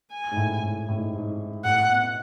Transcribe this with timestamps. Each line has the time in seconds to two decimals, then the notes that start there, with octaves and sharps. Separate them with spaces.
0.12 G#5
0.31 G#2
0.37 A2
0.62 A2
0.88 A2
0.97 G#2
1.16 G#2
1.64 A2 F#5
1.89 B2